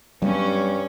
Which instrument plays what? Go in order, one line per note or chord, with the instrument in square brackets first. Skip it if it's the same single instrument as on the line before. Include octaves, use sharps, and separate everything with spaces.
[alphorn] G2 [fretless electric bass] F#3 G3 B3 [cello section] C#4